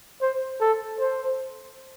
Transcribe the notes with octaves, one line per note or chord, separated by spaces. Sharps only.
C5
A4
C5